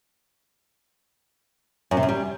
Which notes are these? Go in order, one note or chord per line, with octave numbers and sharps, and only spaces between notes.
F#2
C3
F#2
G3